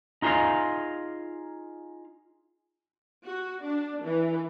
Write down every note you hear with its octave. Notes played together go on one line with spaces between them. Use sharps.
D#4 F4 G#4 C5 D#5 F5
F#4
D4
E3